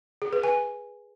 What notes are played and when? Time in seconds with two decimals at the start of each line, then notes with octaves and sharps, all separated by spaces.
0.22 G#4
0.33 B4
0.44 G#5